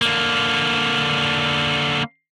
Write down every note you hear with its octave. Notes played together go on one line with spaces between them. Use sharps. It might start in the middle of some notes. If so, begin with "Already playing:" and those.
D3 A#3